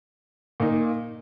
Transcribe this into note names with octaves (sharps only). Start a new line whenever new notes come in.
A#2 A#3 D#4